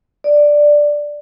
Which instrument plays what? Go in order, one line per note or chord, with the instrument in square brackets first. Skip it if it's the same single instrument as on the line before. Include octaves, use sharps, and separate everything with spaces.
[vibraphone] D5